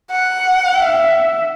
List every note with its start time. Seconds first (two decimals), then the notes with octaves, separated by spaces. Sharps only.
0.11 F#5
0.77 E5